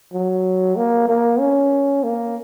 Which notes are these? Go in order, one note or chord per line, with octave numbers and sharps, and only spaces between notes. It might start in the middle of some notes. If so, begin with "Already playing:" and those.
F#3
A#3
A#3
C#4
A#3